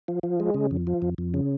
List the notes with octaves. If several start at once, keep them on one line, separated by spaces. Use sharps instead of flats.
F3
F3
G#3
C#3
F2
F3
F2
F2
C#3